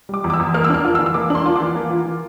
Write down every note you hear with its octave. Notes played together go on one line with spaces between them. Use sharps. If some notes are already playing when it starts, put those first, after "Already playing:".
G3 D6
E2
D6
E6
E2
A#3 F6
E6
D4 F6
F4
E6
E3
E6
A#3 D6
D4 C6
F4
E3 D6
A#3
F4
E3